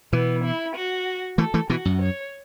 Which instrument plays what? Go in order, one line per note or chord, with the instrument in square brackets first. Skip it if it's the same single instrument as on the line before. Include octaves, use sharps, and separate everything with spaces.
[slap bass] B2 E3 [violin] B3
[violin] E4
F#4
[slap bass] E3 A3 [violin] A4
[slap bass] E3 A3
[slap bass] B2 E3 [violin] F#4
[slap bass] F#2
[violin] C#5